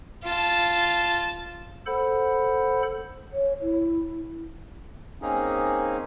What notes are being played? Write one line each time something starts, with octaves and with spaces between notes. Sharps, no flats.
F4 A5
A4 C5 F#5 B5
C#5
E4
A#3 C4 C#4 D#4 G#4